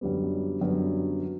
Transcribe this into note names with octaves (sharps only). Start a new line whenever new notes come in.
F#2 D3 G3 B3
F#2 D3 G3 B3